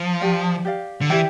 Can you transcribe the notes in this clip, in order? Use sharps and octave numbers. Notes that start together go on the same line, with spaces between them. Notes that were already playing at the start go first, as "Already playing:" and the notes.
Already playing: F3
G4 D5 F5
G4 D5 F5
D3
E3 E4 G4 D5 G5